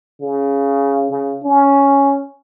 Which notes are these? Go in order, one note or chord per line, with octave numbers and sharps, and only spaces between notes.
C#3
C#3
C#4